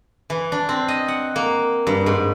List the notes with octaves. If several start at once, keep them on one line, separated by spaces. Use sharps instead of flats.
E3
D4
C4
D#5
F#5
A#3
G2
G#2